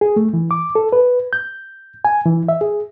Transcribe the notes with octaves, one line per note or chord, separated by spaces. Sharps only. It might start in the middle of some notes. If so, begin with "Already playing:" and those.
G#4
A3
E3
D6
A4
B4
G6
G#5
E3
E5
G#4